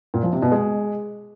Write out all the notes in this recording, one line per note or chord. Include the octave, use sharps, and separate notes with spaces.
A#2
F3
C3
B2
G#3